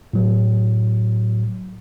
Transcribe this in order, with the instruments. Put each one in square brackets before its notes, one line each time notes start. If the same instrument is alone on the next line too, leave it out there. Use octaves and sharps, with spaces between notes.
[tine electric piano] A2 F#3